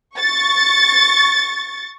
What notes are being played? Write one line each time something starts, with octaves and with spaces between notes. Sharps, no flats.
C#6 A6